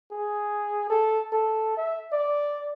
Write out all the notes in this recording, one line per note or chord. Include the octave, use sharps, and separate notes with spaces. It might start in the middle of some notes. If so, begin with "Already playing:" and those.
G#4
A4
A4
E5
D5